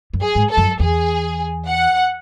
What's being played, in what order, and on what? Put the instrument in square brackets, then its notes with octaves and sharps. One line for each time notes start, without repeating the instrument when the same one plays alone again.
[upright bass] F#2
[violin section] G#4
[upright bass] G#2
[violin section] A4
[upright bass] F#2
[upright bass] E2 [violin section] G#4
[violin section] F#5